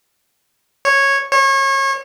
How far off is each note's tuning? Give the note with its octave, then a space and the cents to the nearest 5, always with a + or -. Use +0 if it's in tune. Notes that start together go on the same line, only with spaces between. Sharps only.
C#5 -10
C#5 -30